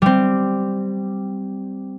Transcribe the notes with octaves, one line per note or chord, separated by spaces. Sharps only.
G3 C4